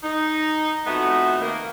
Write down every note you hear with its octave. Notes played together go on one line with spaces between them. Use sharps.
D#4
F2 A3 B3 D#4 F#4 E5
D#3 A#3